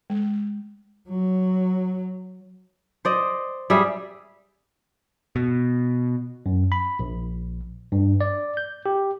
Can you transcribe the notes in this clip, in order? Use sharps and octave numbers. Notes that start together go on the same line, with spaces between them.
G#3
F#3
C5 D5 D#5
G3 G4 G#4 E5
B2
F#2
B5
A#1
G2
D5
G6
G4